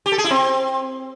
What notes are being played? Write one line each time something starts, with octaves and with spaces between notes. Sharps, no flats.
G4
A4
G#4
E4
C4